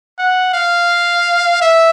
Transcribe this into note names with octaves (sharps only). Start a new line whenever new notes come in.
F#5
F5
E5